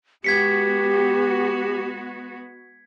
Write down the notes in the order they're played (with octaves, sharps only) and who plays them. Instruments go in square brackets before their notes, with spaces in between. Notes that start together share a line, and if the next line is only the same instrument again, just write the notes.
[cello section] G#3 B3 F#4 [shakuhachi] G4 [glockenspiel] G#6 B6 C#7